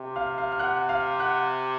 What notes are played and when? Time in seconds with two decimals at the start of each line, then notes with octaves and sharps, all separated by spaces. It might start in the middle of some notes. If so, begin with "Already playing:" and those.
Already playing: C3
0.16 F5 F6
0.38 F5 F6
0.52 F6
0.59 F#5 F#6
0.89 F5 F6
1.19 F#5 F#6